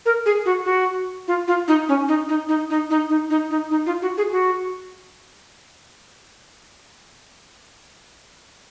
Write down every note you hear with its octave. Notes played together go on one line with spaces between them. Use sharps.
A#4
G#4
F#4
F#4
F4
F4
D#4
C#4
D#4
D#4
D#4
D#4
D#4
D#4
D#4
D#4
D#4
F4
F#4
G#4
F#4